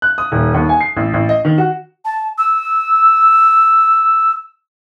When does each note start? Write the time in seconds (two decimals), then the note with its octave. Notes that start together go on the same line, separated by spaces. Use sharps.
0.02 F#6
0.18 D#6
0.32 D#1
0.54 D#2
0.69 G#5
0.81 C7
0.96 A1
1.14 A1
1.29 D#5
1.45 D#3
1.58 F#4
2.05 A5
2.38 E6